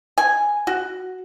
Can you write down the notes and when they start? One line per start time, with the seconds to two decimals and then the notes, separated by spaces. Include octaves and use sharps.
0.18 G#5
0.67 F#4